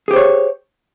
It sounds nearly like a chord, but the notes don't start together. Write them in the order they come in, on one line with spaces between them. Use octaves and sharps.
G#4 G4 C5 C#5